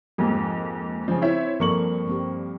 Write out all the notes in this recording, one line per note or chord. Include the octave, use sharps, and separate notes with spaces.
F2 G#2 A#3 G4
C#3 F3 D#5
C4 E4 C#5 E5
G2 F3 A#3 C4 A4 C#6 F#7
G3 C4 G4